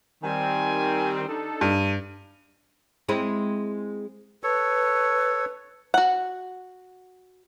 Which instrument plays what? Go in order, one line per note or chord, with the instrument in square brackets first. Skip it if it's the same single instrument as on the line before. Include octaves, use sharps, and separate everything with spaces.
[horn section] D#3 G3 C4 [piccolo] G#5
[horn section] D4 D#4 A4
[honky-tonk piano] G2 [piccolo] D#7
[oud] G#3 C4 E4
[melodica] A4 C#5 [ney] B4
[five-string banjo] F#4 F#5